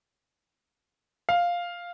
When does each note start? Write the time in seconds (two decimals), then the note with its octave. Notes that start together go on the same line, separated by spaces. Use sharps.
1.29 F5